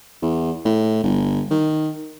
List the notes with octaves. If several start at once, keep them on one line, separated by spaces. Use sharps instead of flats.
E2
A2
G1
D#3